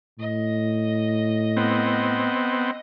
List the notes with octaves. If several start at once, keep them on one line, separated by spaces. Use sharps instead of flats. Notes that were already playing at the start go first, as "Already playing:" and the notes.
A2 D#5
B3 C4